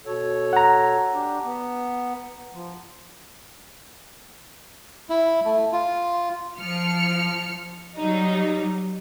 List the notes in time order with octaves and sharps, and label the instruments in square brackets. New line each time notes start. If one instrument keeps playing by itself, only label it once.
[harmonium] B2 A4 C#5
[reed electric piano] F#5 A#5
[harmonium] D4 G4
B3
F3
[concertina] E4
A3
F4
[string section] F3 F6 C#7
F#3 G3 D#4